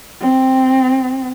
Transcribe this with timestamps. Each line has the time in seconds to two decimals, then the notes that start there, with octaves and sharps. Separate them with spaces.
0.21 C4